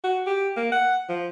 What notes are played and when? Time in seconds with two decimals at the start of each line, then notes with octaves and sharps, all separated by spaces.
0.04 F#4
0.26 G4
0.56 A#3
0.72 F#5
1.09 F3